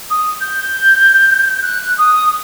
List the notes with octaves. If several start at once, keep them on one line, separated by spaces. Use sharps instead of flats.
D#6
G6
F#6
D#6